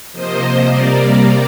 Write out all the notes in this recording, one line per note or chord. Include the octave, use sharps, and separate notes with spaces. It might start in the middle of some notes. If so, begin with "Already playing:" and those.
C3 F3 A#3 C5 D#5
C3 G3 A#3 A#4 D5